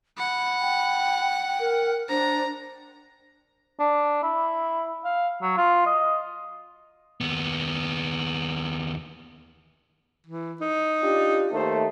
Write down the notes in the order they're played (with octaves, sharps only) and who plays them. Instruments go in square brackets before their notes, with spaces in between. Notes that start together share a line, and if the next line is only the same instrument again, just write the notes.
[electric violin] F#5 [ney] B5
[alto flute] G5
[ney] A#4
[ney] D4 [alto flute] C5 [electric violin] A#5
[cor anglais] D4
E4
F5
F#3
F4
D#5
[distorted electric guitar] D#2 B3
[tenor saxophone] E3
D#4
[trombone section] D4 F4 G4
[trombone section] D#2 A3 [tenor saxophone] C5